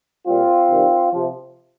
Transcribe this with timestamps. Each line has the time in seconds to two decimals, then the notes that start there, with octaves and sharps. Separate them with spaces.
0.26 A#2 G3 C4 F4
0.70 C3 D#3 G3
1.13 C3 F3